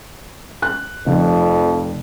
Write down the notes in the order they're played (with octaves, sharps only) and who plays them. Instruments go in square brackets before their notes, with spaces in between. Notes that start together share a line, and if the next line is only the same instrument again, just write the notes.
[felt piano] F#6
[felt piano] F1 [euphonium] F2